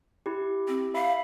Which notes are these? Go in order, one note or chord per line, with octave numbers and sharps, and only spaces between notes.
E4 G4
C4
E5 F5 B5